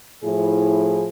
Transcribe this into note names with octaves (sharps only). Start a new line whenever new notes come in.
A2 F3 E4 G#4